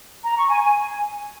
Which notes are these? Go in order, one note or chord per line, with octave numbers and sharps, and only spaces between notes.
A#5
C#6
G#5
G#5